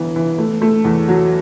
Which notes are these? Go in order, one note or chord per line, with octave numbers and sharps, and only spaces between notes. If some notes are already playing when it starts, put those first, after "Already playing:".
Already playing: G1 E3 B3
E3
A3
A3
E2
F#3